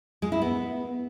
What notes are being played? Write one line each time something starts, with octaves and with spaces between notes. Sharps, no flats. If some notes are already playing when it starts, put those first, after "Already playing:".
G#3
E4
B3